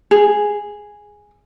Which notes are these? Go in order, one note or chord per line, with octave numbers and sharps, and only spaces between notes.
G#4